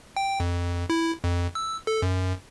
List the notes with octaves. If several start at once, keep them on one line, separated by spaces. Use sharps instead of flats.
G5
F2
E4
F2
E6
A4
F#2